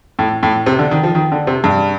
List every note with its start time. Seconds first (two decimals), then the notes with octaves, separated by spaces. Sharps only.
0.19 A2
0.43 A2
0.66 C3
0.79 D3
0.91 D#3
1.03 F3
1.15 D#3
1.32 D3
1.47 C3
1.64 G2